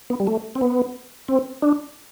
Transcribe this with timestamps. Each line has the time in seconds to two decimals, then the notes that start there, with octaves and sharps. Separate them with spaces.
0.10 B3
0.20 G3
0.27 A3
0.55 C4
0.61 B3
1.28 C4
1.62 D4